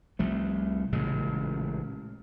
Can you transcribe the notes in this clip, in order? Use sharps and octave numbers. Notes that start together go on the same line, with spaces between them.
C2 F3 A3
A1 A#2 C#3 G#3